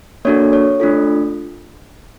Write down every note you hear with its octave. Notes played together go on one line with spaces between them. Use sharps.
A#3 D4 F#4 A4 C#5
C#5
A3 D4 F4 A4